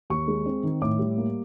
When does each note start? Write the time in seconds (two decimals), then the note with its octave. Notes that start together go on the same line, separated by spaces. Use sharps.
0.10 D#2 C#6
0.28 G#3
0.46 C4
0.63 D#3
0.81 A2 D6
0.99 G3
1.17 A#3